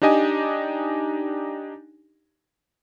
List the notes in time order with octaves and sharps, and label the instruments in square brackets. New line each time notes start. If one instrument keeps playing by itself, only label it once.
[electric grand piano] D4 D#4 G4 D#5 G#5